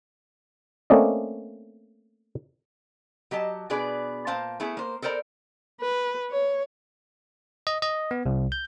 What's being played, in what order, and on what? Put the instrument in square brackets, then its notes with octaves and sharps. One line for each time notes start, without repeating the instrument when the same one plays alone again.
[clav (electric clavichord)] A3 A#3 C4 C#4 D5 D#5
[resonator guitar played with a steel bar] F#3 G4 D#5 A5
B2 D4 G#4 B4 D5
A#2 C5 F5 A5
A3 B3 E4 G#4
A#3 C5
A4 A#4 C5 D5 A#5
[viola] B4
C#5
[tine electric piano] D#5
D#5
B3
C2
G6